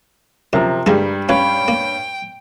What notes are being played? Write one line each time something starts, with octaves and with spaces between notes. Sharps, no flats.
F#2 C3 F3 A#4 A#5
G2 F3 G3 G#3 E4
C#4 B4 C#5 F5 G5 B5
A#3